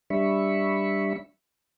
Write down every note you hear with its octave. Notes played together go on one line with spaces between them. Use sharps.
G3 D4 E5 B5 C#6